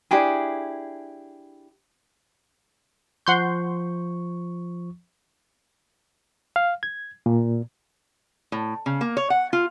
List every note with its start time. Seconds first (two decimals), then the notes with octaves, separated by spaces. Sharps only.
0.11 D4 E4 G4 G#4
3.27 F3 F#5 C6 C#6 G6
6.56 F5
6.83 G#6
7.26 A#2
8.52 A2
8.86 C#3
9.01 A#3
9.17 C#5
9.30 F#5
9.53 F4